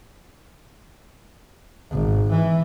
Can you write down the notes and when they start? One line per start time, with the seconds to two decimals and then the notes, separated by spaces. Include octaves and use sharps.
1.90 G#1
2.31 E3